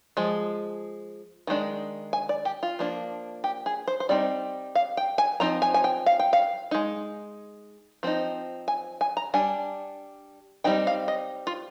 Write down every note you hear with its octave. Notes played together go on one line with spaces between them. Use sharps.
F3 G#3
D#3 G#3 D4
G#5
D5
G4
F4
F3 A#3 D4
G4
G#4
C5
C5
G3 C4 D#4 D5
F5
G5
G#5
F3 C4 D#4 A#5
G#5
G#5
G5
F5
G5
F5
G#3 D#4
F3 C4 D#4
G#5
G#5
A#5
G3 D4 G#5
G3 C4 D#4 G5
F5
D#5
F4